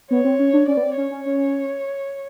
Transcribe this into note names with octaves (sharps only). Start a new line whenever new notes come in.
B3 C#5
C4
C#4
D4
C#4 D5
B3
C4
C#4 C#5
C#4
C#4